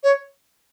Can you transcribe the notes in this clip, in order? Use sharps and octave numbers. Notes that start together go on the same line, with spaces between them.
C#5